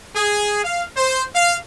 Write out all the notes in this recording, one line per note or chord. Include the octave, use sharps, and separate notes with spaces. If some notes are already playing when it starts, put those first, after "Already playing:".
G#4
F5
C5
F5